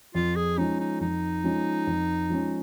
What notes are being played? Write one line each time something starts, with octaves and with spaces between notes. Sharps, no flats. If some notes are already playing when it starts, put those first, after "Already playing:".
F2 F4
G#4
F3 G#3 C#4 D#4
D#4
F2 D#4
F3 G#3 C#4
F2
F3 G#3 C#4